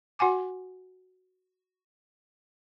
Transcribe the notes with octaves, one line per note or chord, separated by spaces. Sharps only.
F#4 F#5 G#5 D6